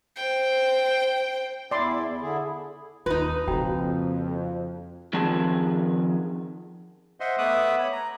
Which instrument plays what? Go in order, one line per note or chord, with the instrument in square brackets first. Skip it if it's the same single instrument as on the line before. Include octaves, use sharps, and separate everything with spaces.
[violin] C5 G5
[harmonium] E2 E4 [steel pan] D5 C6
[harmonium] D3 E4 G#4
[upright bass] D#2 [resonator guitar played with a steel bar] D#4 B4 [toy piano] F4
[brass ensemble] F2 [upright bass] C#3 A#3 [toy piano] F#4 G5 A#5
[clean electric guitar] D#3 F3 C4 F4 G#4 A5
[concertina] C5 D#5 E5 F#5 C6
A3 B3 E5 D6 D#6 F#6
C#5 B5
A#5